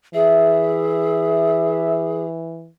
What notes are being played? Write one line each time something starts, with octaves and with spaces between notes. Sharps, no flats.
E3 G#4 E5